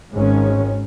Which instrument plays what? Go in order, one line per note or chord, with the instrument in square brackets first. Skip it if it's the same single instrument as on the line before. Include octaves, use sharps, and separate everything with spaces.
[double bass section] G#1 G#2 D#3 G#3 C#4